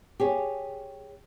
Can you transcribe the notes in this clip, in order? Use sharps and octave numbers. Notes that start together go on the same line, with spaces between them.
G4 G#4 C#5